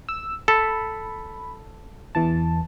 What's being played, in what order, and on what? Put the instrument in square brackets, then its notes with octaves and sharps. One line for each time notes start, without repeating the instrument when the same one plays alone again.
[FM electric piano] E6
[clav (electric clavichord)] A4 [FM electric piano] B5
[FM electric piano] E2 E3 A5